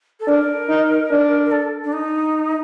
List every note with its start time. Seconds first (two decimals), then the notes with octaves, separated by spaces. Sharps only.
0.20 A4
0.28 D4 A#4
0.69 D#4
1.11 D4
1.45 A#4
1.52 A4
1.84 D4
1.93 D#4